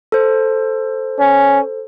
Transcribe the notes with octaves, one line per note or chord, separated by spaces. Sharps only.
A4 C5
C#4